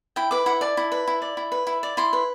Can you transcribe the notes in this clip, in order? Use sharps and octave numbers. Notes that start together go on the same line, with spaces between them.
E4 G5
B4 D6
E4 F#5
D5 A5
E4
B4
E4
D5
E4
B4
E4
D5
E4 C6
B4